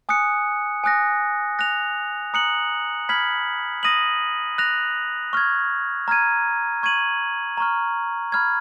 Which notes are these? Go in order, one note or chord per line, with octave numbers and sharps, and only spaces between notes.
G#5 D#6 F#6 C#7
G#5 D#6 F#6 A#6
F#6 A#6 F7
A#5 D#6 F#6 C#7 F#7
B5 F6 G#6 B6 F#7
D#6 A#6 D#7 F#7
F#6 A#6 F7
C#6 F6 G#6
A#5 F6 G#6 D#7
C#6 G#6 D#7 F#7
A#5 C#6 F6
B5 F6 G#6